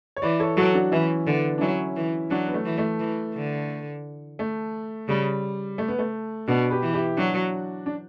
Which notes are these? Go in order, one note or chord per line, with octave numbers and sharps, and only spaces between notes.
C#5
E3 B4 D5
A4 C#5
F#3 F#4 A4
D4 F#4
E3 C#4 E4
D3 B3 D4
D4
F#3 C#4 E4
E3
F#3 D4 F#4
B3
A3
E3
A3
E3
D3
A3
C#3 G3
A3
B3
A3
B2 D4 F#4
G4 B4
E3
E4 G4
F#3 D4 F#4
D4